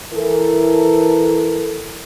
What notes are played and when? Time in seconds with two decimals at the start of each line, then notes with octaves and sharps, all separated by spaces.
0.13 E3 A4 A#4